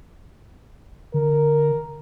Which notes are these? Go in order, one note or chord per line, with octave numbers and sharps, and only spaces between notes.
D3 A#4